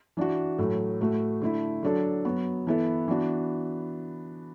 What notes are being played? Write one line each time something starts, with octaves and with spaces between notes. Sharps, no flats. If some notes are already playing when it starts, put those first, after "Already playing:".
E3 D4 F#4
A2 F#3 A3
A2 A3 F#4
D3 A3 E4
D3 F#3 D4 A4
F#3 B3 F#4
E3 B3 E4 A4
E3 B3 D4 F#4